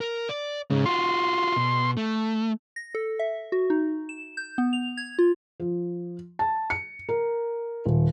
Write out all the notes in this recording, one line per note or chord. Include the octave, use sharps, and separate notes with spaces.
A#4
D5
G#2 C#3
F4 F#4 C6
B2
A3
A#6
A4
E5
F#4
D#4
E7
G6
B3
F7
G#6
F4
F3
A5
C#7
A#4
D#1